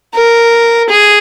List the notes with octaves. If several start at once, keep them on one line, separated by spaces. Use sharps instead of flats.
A#4
G#4